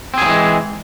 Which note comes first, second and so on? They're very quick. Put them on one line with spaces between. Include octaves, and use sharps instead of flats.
C4 G#4 F#3 E3 G#3